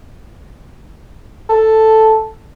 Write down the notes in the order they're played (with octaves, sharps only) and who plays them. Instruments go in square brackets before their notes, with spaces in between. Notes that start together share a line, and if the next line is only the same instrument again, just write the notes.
[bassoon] A4